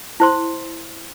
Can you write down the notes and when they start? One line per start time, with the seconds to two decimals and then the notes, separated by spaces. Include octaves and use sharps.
0.20 E4 C5 C6